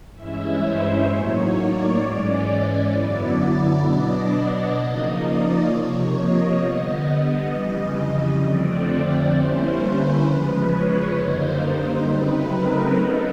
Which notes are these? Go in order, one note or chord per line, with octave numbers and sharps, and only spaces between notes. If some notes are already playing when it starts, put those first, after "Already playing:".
G2 E3 G#3 C#4 E4 E5
C5
A2 F#3 A#3 D#4 C#5
D5
G#2 E3 G#3 C#4
F#2 D3 F#3 B3 E4
B2 F#3 B3 D4 D#5
C#3 F3 A#3 D#4 D#5
D5
C3 F3 A#3 C#5
D#5
D3 G3 B3 D#5
D#5
F2 C#3 E3 G3
F2 D3 F3 A3 C4 D5
D5
D3 G3 A#3 C#4 E4 C5
B4
E2 C#3 F3 G#3 B4
C#5
F#2 D3 G3 A#3 D#4 C5
C5
C#3 F#3 A3 C4 D#4 B4
A#4
C#3 F#3 B3 D#4 A4